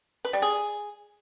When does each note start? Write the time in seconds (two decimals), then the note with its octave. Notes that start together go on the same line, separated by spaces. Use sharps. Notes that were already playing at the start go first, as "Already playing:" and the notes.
0.25 B4
0.33 G3
0.42 G#4